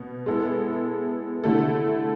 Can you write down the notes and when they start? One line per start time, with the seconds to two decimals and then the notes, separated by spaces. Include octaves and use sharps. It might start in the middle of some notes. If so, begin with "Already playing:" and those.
Already playing: B2 B3
0.26 G#3 B3 E4 A4
1.44 D3 A3 E4 A4